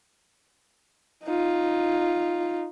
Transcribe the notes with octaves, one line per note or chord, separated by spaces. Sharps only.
D#4 F4